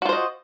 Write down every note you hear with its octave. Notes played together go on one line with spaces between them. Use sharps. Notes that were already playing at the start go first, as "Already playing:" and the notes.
F4 F#4 C5 D#5